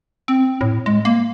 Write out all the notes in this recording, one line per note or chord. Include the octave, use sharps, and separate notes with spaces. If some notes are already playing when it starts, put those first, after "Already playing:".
C4
A2
G#3
A#3